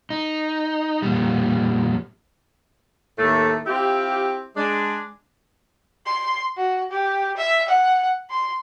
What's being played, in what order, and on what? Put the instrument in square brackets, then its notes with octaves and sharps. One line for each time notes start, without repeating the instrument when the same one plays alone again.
[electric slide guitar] D#4
F2 A#2 G3
[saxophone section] D#2 A2 A3
C4 E4 F4 G4
G#3 D4
[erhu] C6
F#4
G4
E5
F#5
C6